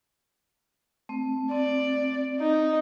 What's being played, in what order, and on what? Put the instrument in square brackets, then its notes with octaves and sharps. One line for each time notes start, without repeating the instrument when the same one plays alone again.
[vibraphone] A3 C4
[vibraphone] C4 [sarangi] D5
[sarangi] D#4